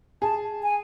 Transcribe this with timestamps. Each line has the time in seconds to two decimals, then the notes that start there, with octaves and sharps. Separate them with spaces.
0.22 G#4 A5
0.63 G#5